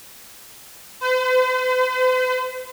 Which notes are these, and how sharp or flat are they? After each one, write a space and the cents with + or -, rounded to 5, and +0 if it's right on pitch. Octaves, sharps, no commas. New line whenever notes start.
C5 -45